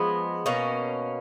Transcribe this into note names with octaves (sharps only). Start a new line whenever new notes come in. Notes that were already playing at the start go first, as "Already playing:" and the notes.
Already playing: F3 G#3 B3
B2 A#3 C#4